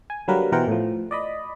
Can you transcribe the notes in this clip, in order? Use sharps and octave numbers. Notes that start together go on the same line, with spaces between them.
G#5
D3 F#3 G3 A#3 A#4 B4
B2 E3 A#4 C5 F#5 G5
A2 F3
D5 D#5 B5